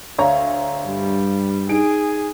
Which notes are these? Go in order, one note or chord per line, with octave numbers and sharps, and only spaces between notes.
D2 C#5 D5 F5 A#5
G2 G3
D#4 G#4 D7